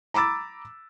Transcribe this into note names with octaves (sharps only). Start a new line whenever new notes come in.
A#5 B5 D6 E6 A6